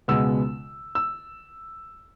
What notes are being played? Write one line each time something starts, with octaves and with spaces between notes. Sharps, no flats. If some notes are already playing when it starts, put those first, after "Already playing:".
C#2 B2 G#3 B3 E6
E6